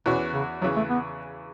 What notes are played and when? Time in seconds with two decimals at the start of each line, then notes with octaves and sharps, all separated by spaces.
0.06 E2 B2 E3 C#4 F#4
0.33 C#3
0.61 E2 C#3 E3 F#3
0.77 A3
0.90 B3